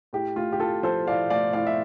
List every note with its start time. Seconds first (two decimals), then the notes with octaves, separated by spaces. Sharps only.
0.13 A2 G4
0.36 A3 F4
0.52 G4
0.60 A2 F4 A4
0.83 F3 A4 C5
1.07 A2 D5 F5
1.30 A3 D5 F5
1.53 A2 D5 F5
1.67 E5